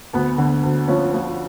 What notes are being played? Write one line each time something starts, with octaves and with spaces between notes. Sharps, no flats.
D2 B3
D3
D2
F3 C#4
F3